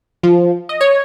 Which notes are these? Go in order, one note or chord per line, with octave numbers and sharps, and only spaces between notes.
F3
D#5
C#5